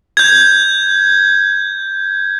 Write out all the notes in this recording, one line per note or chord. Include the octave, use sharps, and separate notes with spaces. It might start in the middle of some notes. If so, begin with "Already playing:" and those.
G6 G#6